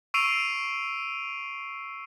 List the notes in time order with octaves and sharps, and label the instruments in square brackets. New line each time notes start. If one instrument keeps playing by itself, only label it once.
[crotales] C#6 E6 C7 D7 D#7 F7